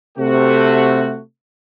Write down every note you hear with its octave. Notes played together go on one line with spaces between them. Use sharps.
C3 A3 F#4